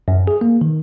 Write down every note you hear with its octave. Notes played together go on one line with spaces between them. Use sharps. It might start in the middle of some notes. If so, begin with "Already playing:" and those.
F#2
G#4
A#3
D#3